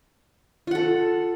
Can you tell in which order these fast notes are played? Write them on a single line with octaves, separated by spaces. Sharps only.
F4 F#5 A4